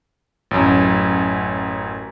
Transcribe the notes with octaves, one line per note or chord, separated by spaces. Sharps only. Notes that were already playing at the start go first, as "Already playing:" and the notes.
A1 F#2